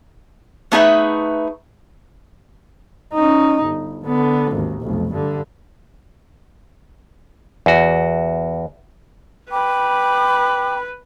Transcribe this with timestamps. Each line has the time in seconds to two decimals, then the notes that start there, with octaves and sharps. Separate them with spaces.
0.72 A3 B3 D#4 G#4 B4 E5
3.14 C#4 D#4
3.63 G1
4.06 D3 B3
4.52 G#1 D#2
4.81 F1 B1
5.13 G2 D3
7.66 E2 F#4
9.51 B4 G5 B5 D6